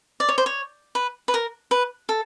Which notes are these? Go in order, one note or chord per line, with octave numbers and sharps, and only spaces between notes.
D5
C#5
C5
C#5
B4
B4
A#4
B4
A4